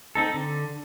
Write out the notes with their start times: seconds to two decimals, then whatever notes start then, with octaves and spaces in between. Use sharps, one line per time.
0.15 C4 D#4 A4
0.34 D3